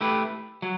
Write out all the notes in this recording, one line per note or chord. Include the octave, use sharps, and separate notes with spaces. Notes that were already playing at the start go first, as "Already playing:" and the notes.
A3 E4 G4 B4
F#3